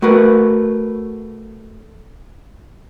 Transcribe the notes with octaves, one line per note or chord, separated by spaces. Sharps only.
A3 F#4 A#4 B4